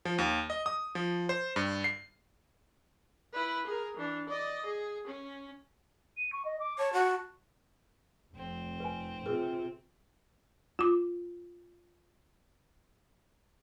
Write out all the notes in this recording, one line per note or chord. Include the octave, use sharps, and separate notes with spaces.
F3
D#2
D#5
D#6
F3
C5
G2
C7
E4 B4
G#4 A#4
E3 D4
D5 D#5
G#4
C#4
D#7
C#6
D#5
D6
C#5 A5
F#4
F1 C4
B4 G#5
C3 F4 G#4 A#4 B4
F4 D6